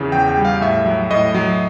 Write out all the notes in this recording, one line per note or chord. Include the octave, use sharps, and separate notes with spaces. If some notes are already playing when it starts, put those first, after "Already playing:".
Already playing: E2 C#3 E3
E2 G5
G5
G3
F5
A2 E5
F#3
A2 D#5
F#3